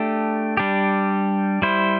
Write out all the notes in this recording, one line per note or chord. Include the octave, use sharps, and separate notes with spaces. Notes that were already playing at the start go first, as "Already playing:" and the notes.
Already playing: A3 D4 G4
G3 D4 G4
G3 E4 C5